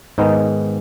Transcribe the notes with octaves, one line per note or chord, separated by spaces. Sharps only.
G#2 D#3 G#3 B3 D#4